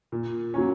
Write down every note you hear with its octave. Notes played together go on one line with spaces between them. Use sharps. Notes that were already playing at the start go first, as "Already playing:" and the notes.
A#2
F#3 A#3 C#4